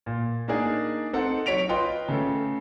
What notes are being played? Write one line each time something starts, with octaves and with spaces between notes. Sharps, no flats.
A#2
A#3 D4 D#4 G#4 D5
C4 D#4 A4 F#5
F#3 C#5 B6 D7 F7
F4 B4 D#5 G5 C6
C#3 A3 A4